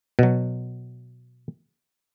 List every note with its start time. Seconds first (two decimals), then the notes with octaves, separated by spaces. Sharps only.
0.19 B2 F#3